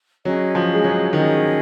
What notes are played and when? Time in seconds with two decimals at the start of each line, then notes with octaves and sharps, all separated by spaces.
0.25 F#3 C#4 G#4 D#5
0.55 F3
0.74 G#3
0.84 F#3
1.13 D#3 C#4 G#4 D#5